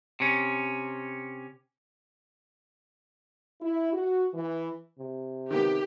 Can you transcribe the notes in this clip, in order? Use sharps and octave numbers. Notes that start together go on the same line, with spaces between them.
C3 C#4
E4
F#4
E3
C3
D#3 B3 G4